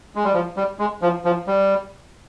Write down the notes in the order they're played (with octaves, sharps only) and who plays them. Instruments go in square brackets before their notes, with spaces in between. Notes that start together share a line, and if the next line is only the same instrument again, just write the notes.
[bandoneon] G#3
G3
F3
G3
G#3
F3
F3
G3